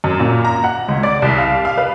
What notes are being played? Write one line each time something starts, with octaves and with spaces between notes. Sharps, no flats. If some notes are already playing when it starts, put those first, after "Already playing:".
F#2
A#2
A#5
F#5
C#2
D5
C2
F5
F5
B4